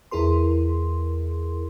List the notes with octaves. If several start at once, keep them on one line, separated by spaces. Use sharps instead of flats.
E2 E4 G#4 A#4 C6